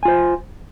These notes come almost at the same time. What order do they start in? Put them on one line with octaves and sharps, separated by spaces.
G#5 F4 C5